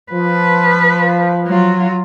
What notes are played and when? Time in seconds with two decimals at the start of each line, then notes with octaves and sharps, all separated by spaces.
0.13 F3 B4
1.47 F#3 F4